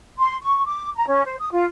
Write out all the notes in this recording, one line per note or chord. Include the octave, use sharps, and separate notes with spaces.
C6
C#6
D6
A#5
C#4
C5
D#6
F4